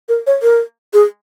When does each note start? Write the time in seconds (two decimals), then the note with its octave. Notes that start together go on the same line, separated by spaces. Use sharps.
0.09 A#4
0.27 C#5
0.43 A#4
0.93 G#4